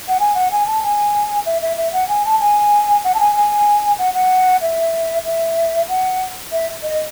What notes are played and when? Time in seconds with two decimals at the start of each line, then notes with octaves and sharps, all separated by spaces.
0.08 F#5
0.20 G#5
0.35 F#5
0.52 G#5
0.67 A5
0.83 G#5
1.46 E5
1.62 E5
1.77 E5
1.93 F#5
2.09 G#5
2.25 A5
2.40 G#5
3.04 F#5
3.15 A5
3.20 G#5
3.36 G#5
3.99 F#5
4.14 F#5
4.62 E5
5.25 E5
5.89 F#5
6.52 E5
6.83 D#5